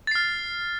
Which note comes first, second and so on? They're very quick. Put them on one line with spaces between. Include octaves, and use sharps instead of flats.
A6 C7 F6